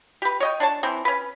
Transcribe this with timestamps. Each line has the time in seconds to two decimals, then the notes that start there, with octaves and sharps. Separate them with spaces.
0.22 G4 B4
0.40 C#5 D#5 G5
0.60 D4 C#5 A5
0.83 E3 C4
1.05 C#4 B4